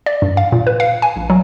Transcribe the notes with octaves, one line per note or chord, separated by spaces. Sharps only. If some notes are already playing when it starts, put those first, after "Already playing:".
D5
G2
F5
A#2
B4
F5
G#5
A#1
F#3